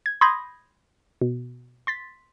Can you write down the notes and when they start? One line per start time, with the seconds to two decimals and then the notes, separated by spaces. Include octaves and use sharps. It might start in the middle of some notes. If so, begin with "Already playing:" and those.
0.06 G#6
0.21 B5 C6 D#6 G6 G#6 A#6
1.21 B2
1.87 C6 A6 B6